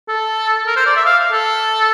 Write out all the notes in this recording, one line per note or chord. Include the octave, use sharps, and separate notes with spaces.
A4
A#4
C5
D5
E5
F5
A4